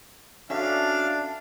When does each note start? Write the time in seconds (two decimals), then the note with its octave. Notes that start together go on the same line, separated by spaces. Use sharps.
0.50 C#4 D4 F#4 A4 E5 F5